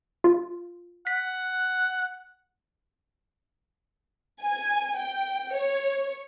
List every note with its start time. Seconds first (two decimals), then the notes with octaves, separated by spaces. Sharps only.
0.24 F4
1.07 F#5 B6
4.42 G#5
4.98 G5
5.54 C#5